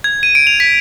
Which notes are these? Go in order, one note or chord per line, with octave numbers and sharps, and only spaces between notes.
G#6
D#7
D7
F7
B6